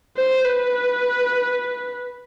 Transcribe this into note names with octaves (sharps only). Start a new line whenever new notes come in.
C5
B4